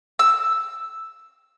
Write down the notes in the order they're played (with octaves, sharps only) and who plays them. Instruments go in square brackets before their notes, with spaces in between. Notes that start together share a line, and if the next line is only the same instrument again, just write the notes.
[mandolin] E6